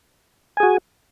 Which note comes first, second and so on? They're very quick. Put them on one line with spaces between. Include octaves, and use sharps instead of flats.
G#5 G#4 F#4